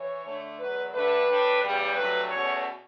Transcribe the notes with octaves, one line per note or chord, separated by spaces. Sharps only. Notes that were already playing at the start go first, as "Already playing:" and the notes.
Already playing: E3 C#5
D3 A3 D4
E2 B2 F#3 B4
G2 D3 A3 D4 B4
A2 G3 D4
E2 C#3 E3 G3
G2 F#3 A3 B4
E2 B2 A3 C#4 C#5